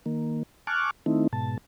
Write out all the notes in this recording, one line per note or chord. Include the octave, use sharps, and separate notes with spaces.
D#3 A#3
G#5 A5 C#6 D6 F6 F#6
D#3 A3 C4 D#4 E4
G#2 B2 A5